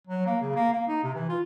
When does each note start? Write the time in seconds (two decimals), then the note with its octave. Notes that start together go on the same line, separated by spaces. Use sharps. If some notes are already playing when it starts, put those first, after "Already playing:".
0.07 F#3
0.26 A#3
0.41 C#3
0.55 A#3
0.73 A#3
0.88 D#4
1.04 C3
1.15 E3
1.29 F4